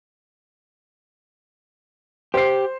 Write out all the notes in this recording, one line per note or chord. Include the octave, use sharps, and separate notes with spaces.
G4 C5 C7